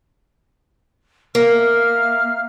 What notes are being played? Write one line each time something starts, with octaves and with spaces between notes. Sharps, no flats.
A#3 E5 F5 F6